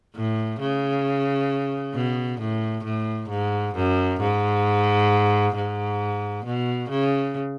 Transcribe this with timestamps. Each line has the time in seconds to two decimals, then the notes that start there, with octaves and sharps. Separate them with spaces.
0.15 A2
0.60 C#3
1.95 B2
2.40 A2
2.85 A2
3.29 G#2
3.75 F#2
4.20 G#2
5.55 G#2
6.45 B2
6.90 C#3